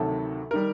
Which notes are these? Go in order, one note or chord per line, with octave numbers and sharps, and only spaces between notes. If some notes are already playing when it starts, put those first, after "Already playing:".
Already playing: D2 C3 D#3 F#3 A4
D#3 G3 A#4